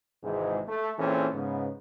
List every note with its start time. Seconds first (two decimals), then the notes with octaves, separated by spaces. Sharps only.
0.23 G#1 G#2 C3 E3 G#3
0.68 A3
0.98 A#2 E3 C4 C#4 G#4 A4
1.34 G#2 C#3 B3